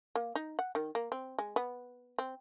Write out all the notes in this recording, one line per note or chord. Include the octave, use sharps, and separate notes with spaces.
A#3
D#4
F#5
D#3
A#3
C4
G#3
B3
C4